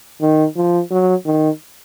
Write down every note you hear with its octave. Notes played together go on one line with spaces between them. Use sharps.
D#3
F3
F#3
D#3